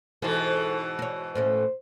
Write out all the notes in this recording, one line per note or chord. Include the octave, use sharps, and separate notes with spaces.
G#2 B2 E3 A4 C5
F#4 C#5
A2 A3 C#4 C5